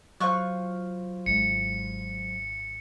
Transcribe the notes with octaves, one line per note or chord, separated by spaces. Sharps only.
F#3 F4 C5 C#6 F#6
G#1 G#3 C#7